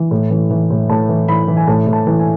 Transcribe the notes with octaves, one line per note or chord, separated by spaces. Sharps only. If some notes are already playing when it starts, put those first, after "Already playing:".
Already playing: E3
A2
E3
E3
A2
A2 A5
E3
E3 B5
E3
G#5
A2 A5
A2
A5
E3
G#5